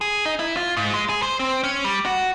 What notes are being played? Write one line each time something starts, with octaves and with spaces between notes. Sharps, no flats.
G#4
D#4
E4
F4
G#2
G#3
G#4
C5
C4
C#4
G3
F#4